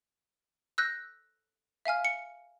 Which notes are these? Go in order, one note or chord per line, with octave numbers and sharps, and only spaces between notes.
E6 F#6 G6 A#6
E5 F5 G#5 F6
C#7